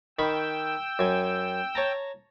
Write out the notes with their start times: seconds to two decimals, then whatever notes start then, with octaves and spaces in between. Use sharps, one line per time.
0.19 D#3 G5 B5 C#6 E6
0.99 F#2 G#5
1.75 C#5 A5 A#5